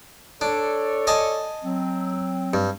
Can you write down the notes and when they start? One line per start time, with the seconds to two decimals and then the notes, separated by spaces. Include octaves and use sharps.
0.41 D4 A4 C#5 D5
1.07 D#5 G#5 A5
1.63 F#3 C4
2.54 G2